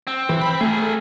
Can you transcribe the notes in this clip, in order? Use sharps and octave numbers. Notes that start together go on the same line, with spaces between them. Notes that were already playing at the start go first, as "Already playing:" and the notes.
C4
E3
B5
A3 G#4 A#4